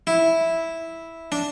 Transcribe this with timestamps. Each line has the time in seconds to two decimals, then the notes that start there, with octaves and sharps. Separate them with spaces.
0.07 E4
1.32 D4